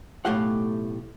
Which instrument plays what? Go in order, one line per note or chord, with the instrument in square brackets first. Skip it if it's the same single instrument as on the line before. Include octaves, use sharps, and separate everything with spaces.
[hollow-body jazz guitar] B1 A2 A3 G4 F5 F#5